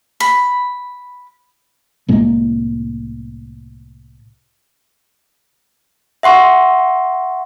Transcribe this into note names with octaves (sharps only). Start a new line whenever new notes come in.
B5
C2 A2 G#3 A#3
E5 F#5 C6 C#6